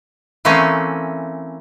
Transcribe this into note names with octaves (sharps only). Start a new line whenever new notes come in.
E3 A3 A#3 C4 C#4